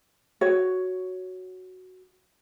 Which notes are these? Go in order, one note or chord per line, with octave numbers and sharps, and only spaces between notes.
F#4 C#5